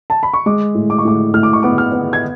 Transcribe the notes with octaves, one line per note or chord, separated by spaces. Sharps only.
A5
B5
C#6
G#3 D6
A2
D6
C#6
A2 D6
A2 F6
D6
C#6
B3 D6
F6
B3
G#6